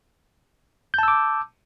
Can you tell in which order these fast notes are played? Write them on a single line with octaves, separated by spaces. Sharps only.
G6 A5 E6 D6